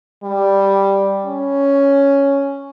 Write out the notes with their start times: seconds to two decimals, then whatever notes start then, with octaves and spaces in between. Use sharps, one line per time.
0.24 G3
1.26 C#4